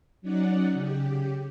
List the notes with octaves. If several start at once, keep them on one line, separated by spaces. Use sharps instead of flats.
F#3 C#4 D#4 D5 F#5
C#3 G4